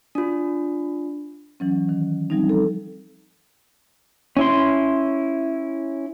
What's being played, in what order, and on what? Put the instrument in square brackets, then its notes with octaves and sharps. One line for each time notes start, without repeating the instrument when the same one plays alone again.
[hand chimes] D4 F4
[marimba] E3 F#3 C#4
D#3
F3 G3 C4 D#4
A4
[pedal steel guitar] C#4 E4 C6